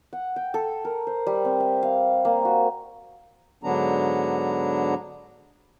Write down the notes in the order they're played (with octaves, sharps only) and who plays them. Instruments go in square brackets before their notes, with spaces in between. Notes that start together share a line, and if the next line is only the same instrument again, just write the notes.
[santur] F#5
G5
A4
A#4
C5
G3
C4
E5
F5
A#3
F#4
[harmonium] G#2 D3 F#3 B3 D4 A#5